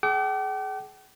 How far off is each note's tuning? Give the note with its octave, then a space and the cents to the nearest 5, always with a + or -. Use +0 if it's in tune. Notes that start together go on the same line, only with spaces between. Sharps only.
G#4 +30 G5 -45 D6 +0